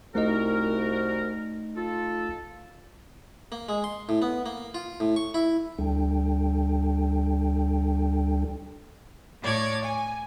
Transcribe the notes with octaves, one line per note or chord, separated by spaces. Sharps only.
C2 A3 D#4 F#4 A#4 D#5
F4 A4
A#3
G#3
C6
A2
B3
A#3
F4
A2
C#6
E4
D2 G3 D4 A4 G5
A2 C#5 D5 G#6
G#5